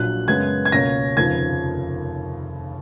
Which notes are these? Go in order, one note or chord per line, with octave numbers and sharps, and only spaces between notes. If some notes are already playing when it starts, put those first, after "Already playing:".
Already playing: A#1 A#2 F#3 F#6
F#2 C#3 G#3 B3 G#6
G#6
C#2 B2 A#3 C#4 A#6
F1 D#2 C#3 F3 G#6